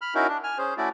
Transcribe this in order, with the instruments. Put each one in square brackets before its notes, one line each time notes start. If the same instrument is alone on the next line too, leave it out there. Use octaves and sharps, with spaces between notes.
[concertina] B5 F6
C#4 D#4 E4 F#4 A#4
D4
G#5 F6
C#4 G#4 C5
A3 C#4 E4 F#4 D5